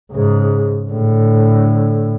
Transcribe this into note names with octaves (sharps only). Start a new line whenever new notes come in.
G#2 C#3
A2 D3